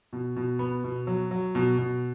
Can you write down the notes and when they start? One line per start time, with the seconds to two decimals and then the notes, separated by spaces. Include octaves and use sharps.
0.13 B2
0.36 B2
0.59 B3
0.84 B2
1.07 F#3
1.31 F#3
1.55 B2
1.78 B2